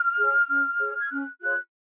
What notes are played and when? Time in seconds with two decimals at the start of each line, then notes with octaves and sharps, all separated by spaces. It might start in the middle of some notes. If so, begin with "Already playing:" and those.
Already playing: F6
0.17 G#4 C#5
0.48 C#4
0.79 G#4 C#5
0.98 G#6
1.10 C#4 F#6
1.40 F4 G#4 C#5 F#6